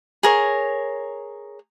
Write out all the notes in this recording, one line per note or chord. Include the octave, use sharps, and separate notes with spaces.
G#4 A#4 C#5